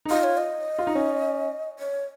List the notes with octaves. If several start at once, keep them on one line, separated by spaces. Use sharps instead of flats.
D#4
F4 D#5
C#5
D#5
F4
D#4
C#4
C#5